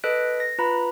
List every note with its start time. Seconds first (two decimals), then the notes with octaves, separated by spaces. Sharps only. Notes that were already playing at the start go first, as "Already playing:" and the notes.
0.04 A4 B4 D#5 F#6 B6 D7
0.40 A#6
0.59 F4 B4 A#5 B5